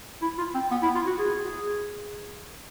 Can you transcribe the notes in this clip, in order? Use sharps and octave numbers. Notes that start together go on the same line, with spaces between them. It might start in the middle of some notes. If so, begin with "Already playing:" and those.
E4
F4
C4
B3
E4
F4
F#4
G#4